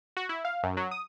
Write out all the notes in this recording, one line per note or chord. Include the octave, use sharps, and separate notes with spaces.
F#4
E4
F5
F#2
F#3
D#6